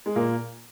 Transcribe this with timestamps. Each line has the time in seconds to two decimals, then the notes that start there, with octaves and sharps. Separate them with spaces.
0.06 G#3
0.16 A#2 A#3